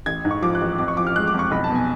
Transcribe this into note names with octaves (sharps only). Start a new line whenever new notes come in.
A1 G#6
G#2
C#6
F3 D6
F#6
A1
F2 D6
C#6
F3 D6
F6
G#3 F#6
D6
F2
C#6
B1 B5
A5
B2 G#5